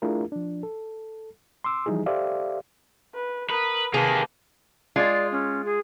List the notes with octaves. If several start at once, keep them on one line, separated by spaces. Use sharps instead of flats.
A3 D4 E4 F4 G#4 A#4
F3 D4
A4
C6 D6 E6
E3 F3 G3 D#4 E4 G#4
G4 A4 C5 D5 E5 F5
B4
A#4 B4 D#6
C3 D#3 A#3 G4 G#4 B4 A5
G#3 F4 D5
C#4
G#4